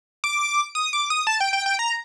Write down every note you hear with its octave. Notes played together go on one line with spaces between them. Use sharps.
D6
D#6
D6
D#6
A5
G5
G5
G5
A#5